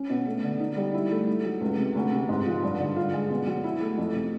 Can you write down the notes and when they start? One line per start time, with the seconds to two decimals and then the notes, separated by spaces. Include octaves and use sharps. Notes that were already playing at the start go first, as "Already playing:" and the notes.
Already playing: C#4
0.10 B2
0.26 A3
0.43 D3
0.60 D#4
0.77 G3
0.94 E4
1.10 A3
1.27 D#4
1.45 F#3
1.61 C#2
1.78 C3
1.95 D2
2.12 C3
2.29 G#2
2.46 F3
2.63 G2
2.79 D3
2.96 F4
3.13 G#3
3.30 B2
3.47 F#3
3.64 E4
3.81 A3
3.98 F2
4.15 C3